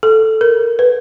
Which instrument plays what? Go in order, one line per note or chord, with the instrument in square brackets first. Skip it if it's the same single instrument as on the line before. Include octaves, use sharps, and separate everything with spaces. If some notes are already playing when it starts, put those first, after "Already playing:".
[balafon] A4
A#4
B4